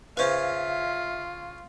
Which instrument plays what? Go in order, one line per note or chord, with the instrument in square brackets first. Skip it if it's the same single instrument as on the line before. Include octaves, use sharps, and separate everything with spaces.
[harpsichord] C#3 C#4 F5 [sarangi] F4 [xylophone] B4 C5 [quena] E5